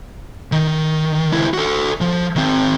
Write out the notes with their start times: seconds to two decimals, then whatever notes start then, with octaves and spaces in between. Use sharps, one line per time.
0.52 D#3
1.33 C#2 E4
1.54 F#4 A4
2.01 F3
2.36 D#3 C4